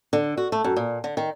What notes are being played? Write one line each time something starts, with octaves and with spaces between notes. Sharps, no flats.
D3
F#4
A3
F#2
A#2
D3
D#3